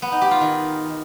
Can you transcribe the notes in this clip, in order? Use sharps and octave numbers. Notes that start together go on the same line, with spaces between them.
B3
D#4
G4
F4
D#3